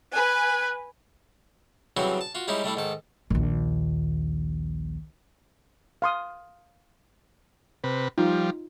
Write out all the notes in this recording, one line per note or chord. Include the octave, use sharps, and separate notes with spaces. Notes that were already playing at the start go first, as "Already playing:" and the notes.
B4 G#5 F#6
C#3 E3 F#3 G3 C4 F#4
A5
F4 F#4
G3 G#3 C#4 D#4 E4 G4
G3 A3 D4 E4
G#2 D#3 A4
A#1 D#2
F5 C6 D#6
C3 B4
F3 G3 D#4 F4